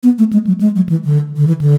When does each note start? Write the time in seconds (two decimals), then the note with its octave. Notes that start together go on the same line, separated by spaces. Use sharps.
0.03 B3
0.18 A3
0.33 G#3
0.47 F#3
0.61 G#3
0.76 F#3
0.89 E3
1.05 D3
1.37 D3
1.47 E3
1.61 D3